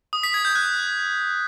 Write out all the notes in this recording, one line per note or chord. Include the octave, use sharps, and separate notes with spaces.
D#6
B6
G#6
G6
F#6